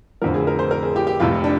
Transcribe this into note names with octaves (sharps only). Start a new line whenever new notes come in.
F1 F2 D3 F3 A#4
G#4
A#4
C5
A#4
G#4
G4
G4
F1 F2 C3 F3 F4
D4